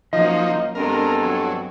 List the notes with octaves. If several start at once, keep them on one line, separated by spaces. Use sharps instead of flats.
F3 F#3 A#3 C#4 D#4 D#5
G2 G#3 B3 C4 D4 A4 A#4
F#3